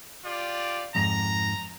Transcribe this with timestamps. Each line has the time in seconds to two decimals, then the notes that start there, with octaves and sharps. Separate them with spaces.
0.24 F4 G4 D5
0.95 F2 G#2 A#5